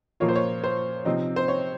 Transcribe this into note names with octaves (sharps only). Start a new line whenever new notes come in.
A#2 F3 A#3 F4 C#5
C5
C#5
C5
C3 F3 C4 D#4
C5
C#5